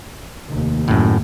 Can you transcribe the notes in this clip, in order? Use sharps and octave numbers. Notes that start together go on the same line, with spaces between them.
F1 D#2
F#2 A2